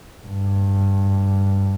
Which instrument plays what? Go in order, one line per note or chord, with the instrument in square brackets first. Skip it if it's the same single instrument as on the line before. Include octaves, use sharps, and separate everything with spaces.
[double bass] G2